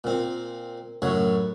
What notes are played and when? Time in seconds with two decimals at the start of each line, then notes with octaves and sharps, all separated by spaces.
0.04 A#2 C4
1.02 F#2 A2 C#5 F#5